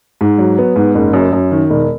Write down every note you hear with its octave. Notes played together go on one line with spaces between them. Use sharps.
G#2
F#3
B3
G#2
F#1
F#2
F#2
D#3
E1